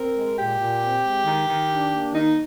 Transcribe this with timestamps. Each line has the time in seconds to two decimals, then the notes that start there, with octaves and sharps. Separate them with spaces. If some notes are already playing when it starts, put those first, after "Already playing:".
Already playing: C4 A#4
0.16 G#3
0.38 A#2 G4
0.59 A#2
0.82 C4
1.04 G#3
1.25 D#3
1.48 D#3
1.69 D4
1.91 A#3
2.13 D#3 D#4